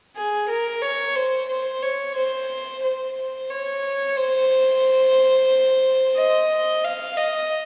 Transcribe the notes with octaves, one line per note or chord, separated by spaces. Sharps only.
G#4
A#4
C#5
C5
C5
C#5
C5
C5
C#5
C5
D#5
F5
D#5